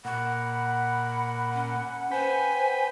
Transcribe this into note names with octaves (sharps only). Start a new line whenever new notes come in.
A#2 F#5 B5
C#4
B4 C5 G5 G#5 B5